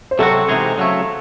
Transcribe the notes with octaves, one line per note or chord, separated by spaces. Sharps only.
C5
C3 F#3 C4 F#4 A4
C3 E3 G#3 D#4 G#4
C#3 F#3 A3